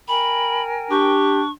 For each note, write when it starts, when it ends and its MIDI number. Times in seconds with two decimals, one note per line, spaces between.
0.08 1.15 70
0.08 1.15 79
0.08 1.15 80
0.08 0.63 83
0.91 1.51 62
0.91 1.40 67
0.91 1.52 85